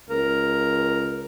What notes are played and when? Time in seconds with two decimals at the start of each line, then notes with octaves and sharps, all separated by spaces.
0.10 C#2 A#4